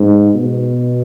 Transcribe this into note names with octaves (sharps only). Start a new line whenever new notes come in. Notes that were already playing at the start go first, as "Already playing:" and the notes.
Already playing: G#2
B2